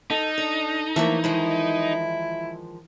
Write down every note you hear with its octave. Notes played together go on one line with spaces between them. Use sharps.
D#4 A4
D4 A4
E3 F3 A3 A#3 E5
D#3 F3 G#3 E4